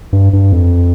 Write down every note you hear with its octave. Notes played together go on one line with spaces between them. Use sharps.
G2
G2
F2